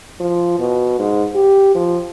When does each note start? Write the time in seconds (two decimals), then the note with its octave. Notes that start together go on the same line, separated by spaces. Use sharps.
0.20 F3
0.59 B2
0.99 G#2
1.35 G4
1.75 F3